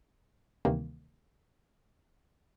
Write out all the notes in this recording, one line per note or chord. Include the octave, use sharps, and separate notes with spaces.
D2 C3 D#3 E3 G3 A#3